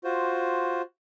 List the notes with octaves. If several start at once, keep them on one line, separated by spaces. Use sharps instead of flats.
F4 F#4 C5